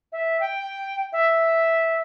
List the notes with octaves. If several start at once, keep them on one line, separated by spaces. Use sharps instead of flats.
E5
G5
E5